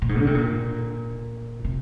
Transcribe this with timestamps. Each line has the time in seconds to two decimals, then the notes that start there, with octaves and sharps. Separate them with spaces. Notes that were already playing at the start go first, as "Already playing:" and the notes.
0.02 A#2
0.09 G#2
0.19 D3
0.27 C3
0.35 A#2
1.64 C3